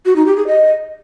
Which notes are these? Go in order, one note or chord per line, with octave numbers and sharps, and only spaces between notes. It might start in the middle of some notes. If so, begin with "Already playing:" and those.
F#4
D#4
G4
G#4
D#5